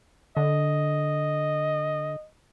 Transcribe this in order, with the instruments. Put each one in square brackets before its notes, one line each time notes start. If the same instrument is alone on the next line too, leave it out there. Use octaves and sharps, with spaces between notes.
[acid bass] D3 [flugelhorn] D#5